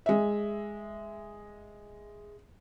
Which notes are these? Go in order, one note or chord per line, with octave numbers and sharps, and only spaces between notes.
G#3 E5